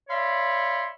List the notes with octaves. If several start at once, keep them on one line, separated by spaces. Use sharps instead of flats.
C#5 D5 E5 F5 B5 C6